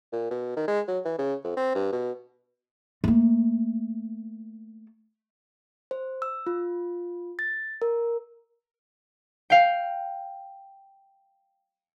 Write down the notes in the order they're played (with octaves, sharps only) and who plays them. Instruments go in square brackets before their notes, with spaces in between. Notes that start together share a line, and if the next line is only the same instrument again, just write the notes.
[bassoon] A#2
B2
D#3
G#3
F#3
E3
C#3
F2
C4
G2
B2
[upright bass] A3 A#3
[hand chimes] C5
E6
F4
A6
A#4
[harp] F5 G5